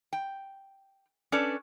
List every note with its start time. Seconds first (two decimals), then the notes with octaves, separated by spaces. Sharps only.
0.13 G5
1.32 C#4 D4 A4 B4 D5